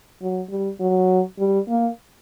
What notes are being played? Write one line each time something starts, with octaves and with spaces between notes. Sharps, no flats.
F#3
G3
F#3
G3
A#3